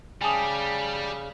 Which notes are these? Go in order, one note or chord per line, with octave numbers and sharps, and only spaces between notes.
C#3 G3 G#5 A5 D#6